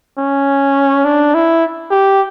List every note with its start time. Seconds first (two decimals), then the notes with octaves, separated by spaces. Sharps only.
0.18 C#4
1.05 D4
1.34 E4
1.91 G4